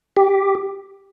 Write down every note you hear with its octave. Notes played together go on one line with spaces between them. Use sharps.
G4